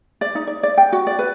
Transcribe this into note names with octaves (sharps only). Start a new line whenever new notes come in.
D5
D#4
D5
D5
G5
F#4
D5
B4